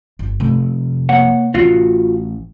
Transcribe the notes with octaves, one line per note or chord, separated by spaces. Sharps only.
G1
F1 C3 A3
A#3 C#5 F#5
A1 A2 F4 F#4